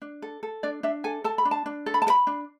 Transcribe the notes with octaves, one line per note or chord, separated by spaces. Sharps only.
D4
A4
A4
D4 D5
D4 E5
A4 G#5
A4 A5
B5
D4
A5
D4
A4
B5
A5
A4
B5
D4